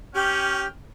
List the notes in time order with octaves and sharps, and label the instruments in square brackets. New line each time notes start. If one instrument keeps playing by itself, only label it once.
[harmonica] C#4 G5 F6 [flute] G4